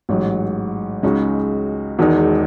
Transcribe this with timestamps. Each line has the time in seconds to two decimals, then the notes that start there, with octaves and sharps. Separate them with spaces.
0.09 A1 G#2 F#3
1.03 C#2 C#3 G#3 D#4 F#4
1.99 E1 E2 D#3 G#3 D#4